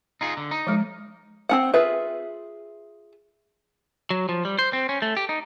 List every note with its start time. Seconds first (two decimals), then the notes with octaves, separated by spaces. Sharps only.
0.21 D#4 F4 G#4
0.37 D3
0.51 D#4
0.67 F3 G#3
1.49 C4 C#4 F#5
1.74 F4 G#4 B4 E5
4.10 F#3
4.29 F3
4.45 G3
4.59 C5
4.73 C4
4.89 C#4
5.02 A3
5.17 G4
5.29 D#4